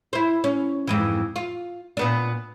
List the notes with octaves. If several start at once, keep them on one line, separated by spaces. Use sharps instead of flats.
E4 C5
C#4
F2 G#2 E3
F4
A#2 B3 D4